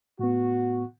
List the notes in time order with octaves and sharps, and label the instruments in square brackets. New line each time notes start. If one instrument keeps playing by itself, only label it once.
[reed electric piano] A2 B3 [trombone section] F#4